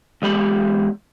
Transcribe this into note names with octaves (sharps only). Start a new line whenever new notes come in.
E2 G#3 G4 B5